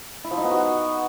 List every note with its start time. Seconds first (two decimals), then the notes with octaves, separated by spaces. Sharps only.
0.24 E4
0.31 F3
0.37 D#4
0.44 B3
0.50 F#4